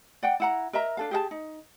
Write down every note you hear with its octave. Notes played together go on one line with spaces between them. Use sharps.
D5 F#5 G5
E4 F#5 A#5
A#4 D#5 E5 A#5
D4 A4 F5
G4 G#4 F#5 A5
D#4